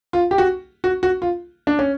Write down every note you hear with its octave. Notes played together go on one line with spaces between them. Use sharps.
F4
G4
F#4
F#4
F#4
F4
D4
C#4